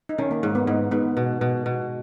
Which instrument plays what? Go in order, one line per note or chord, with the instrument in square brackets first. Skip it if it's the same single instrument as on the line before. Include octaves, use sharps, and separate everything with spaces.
[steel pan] D#4
[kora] D#3 [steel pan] C#4
[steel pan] A#3
[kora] G#2
[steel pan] B3
[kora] G#2 [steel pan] D#4
[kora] G#2 [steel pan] B3
[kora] B2
B2
B2